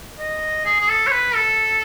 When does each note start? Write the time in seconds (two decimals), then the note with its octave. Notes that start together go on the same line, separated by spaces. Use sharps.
0.19 D#5
0.65 G#4
0.80 G#4
0.89 A4
1.07 C#5
1.12 B4
1.35 A4